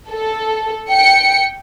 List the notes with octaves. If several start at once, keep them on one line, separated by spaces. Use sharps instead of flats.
A4
G5 C#7